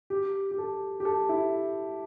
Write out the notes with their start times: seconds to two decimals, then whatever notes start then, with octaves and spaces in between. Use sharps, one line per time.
0.10 G4
0.51 G4
0.58 A4
1.00 G4
1.05 A4
1.29 E4